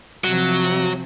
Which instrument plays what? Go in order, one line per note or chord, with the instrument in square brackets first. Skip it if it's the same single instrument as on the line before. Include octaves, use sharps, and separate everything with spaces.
[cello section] C3 F3 [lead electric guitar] F#3